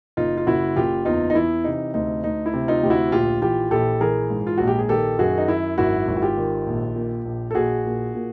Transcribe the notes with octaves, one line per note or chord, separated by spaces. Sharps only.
F#1 D#4 F4
F4
F#1 E4 F#4
F#1 F4 G4
E2 D#4 F4
D#4
E3 E4
C3 D#4
D2 D#4
D2 D#4
E4
C3
D#4 F4
D2 G4
E4 F#4
A#1 F4 G4
E3 F4 G4
A#1 G4 A4
E3 G#4 A#4
G#2
F4
A#1 F#4
G4
G#4
D#3 G4 A4
F#2 F#4 G#4
D#4
F#2 E4
G#1 E4 F#4
G#1
F#4
F4 G4
D#3
A#1
A#2
A#1
A4
A#1 F#4 G#4
A#2
A#2